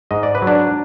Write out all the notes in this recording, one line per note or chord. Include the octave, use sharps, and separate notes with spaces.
G#2 D#5
D5
B4
F#3
D4 D5